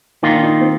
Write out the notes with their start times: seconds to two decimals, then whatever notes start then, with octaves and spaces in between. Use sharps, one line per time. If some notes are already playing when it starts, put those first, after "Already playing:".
0.23 D#3 A#3 D#4 F4
0.34 D4
0.43 D#4
0.61 C4